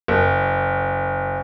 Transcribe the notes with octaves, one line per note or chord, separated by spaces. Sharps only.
F#1